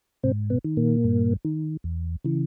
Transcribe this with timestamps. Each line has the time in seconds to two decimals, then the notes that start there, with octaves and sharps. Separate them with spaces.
0.23 G#2 C3 C4
0.50 B2 B3
0.65 D#3
0.77 A#2 A#3
1.04 G2
1.45 D#3
1.84 E2
2.24 C#3 E3